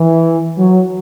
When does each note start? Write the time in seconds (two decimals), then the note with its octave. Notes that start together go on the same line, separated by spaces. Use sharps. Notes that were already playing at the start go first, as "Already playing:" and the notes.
Already playing: E3
0.57 F#3